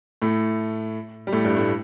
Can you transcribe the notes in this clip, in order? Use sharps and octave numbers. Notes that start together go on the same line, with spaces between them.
A2 A3
G3
A2 A3
G2 G3
A2 A3